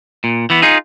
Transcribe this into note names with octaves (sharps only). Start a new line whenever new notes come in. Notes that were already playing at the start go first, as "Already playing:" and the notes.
A#2
E3 B3
D#4 F4 G#4